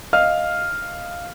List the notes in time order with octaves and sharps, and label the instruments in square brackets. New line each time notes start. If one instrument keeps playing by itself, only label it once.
[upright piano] D#5 F5 F6